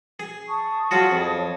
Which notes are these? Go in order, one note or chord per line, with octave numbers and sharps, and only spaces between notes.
G#4
A5 C#6 D#6
F#3 F4 F#4 G#4 A5 D#6
F2
C#5